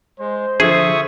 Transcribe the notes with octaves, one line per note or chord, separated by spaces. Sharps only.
G#3 C5
D3 F3 G#4 E5 C#6 D#6 G#6